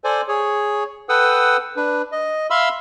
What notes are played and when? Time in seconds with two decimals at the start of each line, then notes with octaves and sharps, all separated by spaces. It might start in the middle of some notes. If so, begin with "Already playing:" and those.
0.04 A4 C5 D5 G#5
0.28 G#4 C#5
1.09 A4 B4 F#5 G5 D#6 E6
1.77 D4 B4
2.12 D#5
2.50 E5 F5 B5 C6 E6